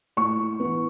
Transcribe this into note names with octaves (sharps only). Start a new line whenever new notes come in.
A2 C#6
E3 B3